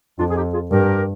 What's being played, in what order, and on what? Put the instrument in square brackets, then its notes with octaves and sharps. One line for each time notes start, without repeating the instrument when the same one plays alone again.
[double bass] F2 [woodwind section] D4 F4
[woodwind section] G#4
D#4 G4
F4 G#4
[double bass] G2 [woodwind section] G4 A#4